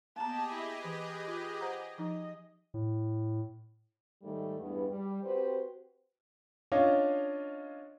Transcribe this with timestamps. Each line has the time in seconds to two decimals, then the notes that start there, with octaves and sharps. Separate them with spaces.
0.16 A#3 B3 G4 G#4 D#5 A5 A#5
0.53 E4
0.84 E3 B4
1.27 F4
1.61 C5 F#5 A#5
1.98 F3 D#4 D#5
2.74 A2
4.23 G#2 D#3 G3 A3
4.59 E2 G2 B3
4.89 G3
5.23 C4 F#4 G4 B4 C5
6.72 C#4 D4 F4 C#5 D#5 F5